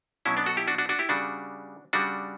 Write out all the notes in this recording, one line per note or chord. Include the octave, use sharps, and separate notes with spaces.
B2 F#3 C#4 E4
B3 D4
F#4 A4
E4 G4
D4 F#4
D4 F#4
D4 F#4
E4 G4
C#3 G3 D4 F#4
C#3 G3 D4 F#4